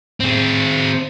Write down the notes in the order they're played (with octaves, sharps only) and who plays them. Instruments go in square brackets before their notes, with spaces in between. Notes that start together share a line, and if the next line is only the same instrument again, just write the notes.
[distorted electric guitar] C4 G#4